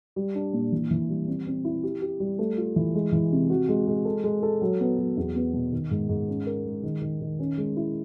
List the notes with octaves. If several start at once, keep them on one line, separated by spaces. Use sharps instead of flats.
G3
D4
A#2
E3
E3
G3
C4
C4
E4
G4
G4
G3
A3
F4
E3
G#3
E3
C3
F#4
G#3
G#3
A4
G#3
A4
F#3
B3
F#3
E2
B3
B2
D#3
G#2
G#2
C#4
A#4
G#3
D#3
D#3
D#3
C#4
G#3
E4